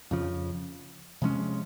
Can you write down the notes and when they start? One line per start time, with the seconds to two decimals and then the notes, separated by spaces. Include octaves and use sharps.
0.11 F2 C#3 F3
1.22 C3 F3 G#3 C#4